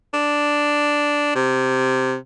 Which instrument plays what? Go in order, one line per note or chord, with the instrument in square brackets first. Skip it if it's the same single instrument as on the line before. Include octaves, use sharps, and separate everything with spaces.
[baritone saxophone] D4
C3